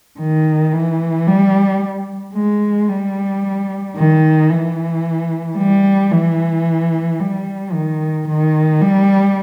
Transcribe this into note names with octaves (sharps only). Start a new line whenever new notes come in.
D#3
E3
G3
G#3
G3
D#3
E3
G3
E3
G3
D#3
D#3
G3